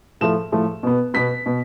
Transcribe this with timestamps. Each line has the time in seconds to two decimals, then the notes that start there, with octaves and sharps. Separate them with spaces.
0.21 A2 F3 A3 E7
0.52 A2 F3 A3
0.83 B2 B3
1.14 B2 B3 B6
1.46 B2